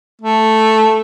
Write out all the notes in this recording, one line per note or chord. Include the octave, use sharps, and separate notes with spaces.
A3